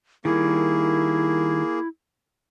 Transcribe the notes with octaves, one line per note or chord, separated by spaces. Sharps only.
D#3 G3 A#3 E4 G#4